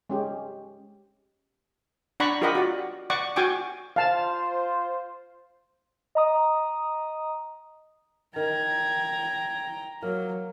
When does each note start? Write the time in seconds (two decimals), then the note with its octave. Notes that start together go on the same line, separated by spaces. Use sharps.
0.10 G#3 C#4 G4
2.20 D4 D5 F#5 A#5 B5 C#6
2.42 F4 G4 A#4 D#5 F#5 B5
2.55 F#4 D5
3.10 D5 F#5 C#6 D6
3.36 F#4 G5 G#5 C#6 D6
3.96 F4 C5 F5 A5
6.15 D#5 A#5 D#6
8.36 D#3 G5 A#5 G#6
10.03 F#3 A#3